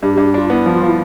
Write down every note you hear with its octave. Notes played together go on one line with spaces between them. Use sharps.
G2 G4
G4
G2
G4
D4 F4
B3 E4
F3
F4
F3
E4